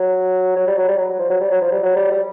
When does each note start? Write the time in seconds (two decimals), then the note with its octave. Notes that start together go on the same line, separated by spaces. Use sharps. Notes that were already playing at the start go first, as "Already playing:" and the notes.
Already playing: F#3
0.56 F#3
0.67 G3
0.77 F#3
0.88 G3
0.98 F#3
1.09 F#3
1.19 F3
1.30 F#3
1.40 G3
1.51 F#3
1.62 F3
1.72 G3
1.83 F#3
1.96 G3
2.11 G3